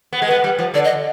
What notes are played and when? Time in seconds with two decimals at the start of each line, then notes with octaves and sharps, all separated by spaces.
0.13 B3
0.22 G#3
0.27 B3 B4
0.44 G3
0.59 F3
0.74 D3 D5
0.84 D#5